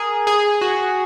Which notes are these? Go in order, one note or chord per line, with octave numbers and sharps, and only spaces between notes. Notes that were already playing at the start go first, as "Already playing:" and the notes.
Already playing: G#4 A#4
G#4
F#4